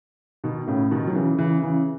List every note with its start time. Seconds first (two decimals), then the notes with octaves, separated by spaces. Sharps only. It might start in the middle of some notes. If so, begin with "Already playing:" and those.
0.44 B2 D#3
0.67 A2 C#3
0.91 B2 D#3
1.07 F#3
1.15 C#3 E3
1.39 C#3 E3
1.62 C#3 E3